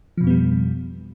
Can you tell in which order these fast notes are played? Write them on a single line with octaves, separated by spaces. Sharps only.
F3 B2 F2 B3 G3